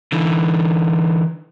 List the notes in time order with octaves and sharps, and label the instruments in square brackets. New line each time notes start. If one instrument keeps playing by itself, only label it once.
[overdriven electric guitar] D3 E3